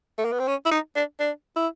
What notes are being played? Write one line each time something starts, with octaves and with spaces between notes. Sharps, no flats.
A3
A#3
B3
C4
C#4
E4
D#4
D4
D4
E4